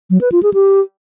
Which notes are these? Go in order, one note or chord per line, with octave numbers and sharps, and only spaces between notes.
F#3
B4
F4
G#4
G4